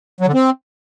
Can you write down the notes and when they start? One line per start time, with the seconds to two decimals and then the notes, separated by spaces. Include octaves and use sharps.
0.21 F#3
0.27 D3
0.34 C4